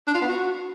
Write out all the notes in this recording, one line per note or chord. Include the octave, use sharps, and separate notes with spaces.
D4
F4
B3
F#4